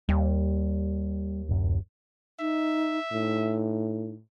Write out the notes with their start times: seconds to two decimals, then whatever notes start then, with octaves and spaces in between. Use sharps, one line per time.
0.09 D#2 G3
1.49 D1 F#2
2.40 D#4 E5
3.13 A2 D#4